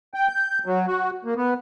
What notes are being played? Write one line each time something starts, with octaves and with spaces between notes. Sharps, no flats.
G5
G6
F#3
F#4
A#3
B3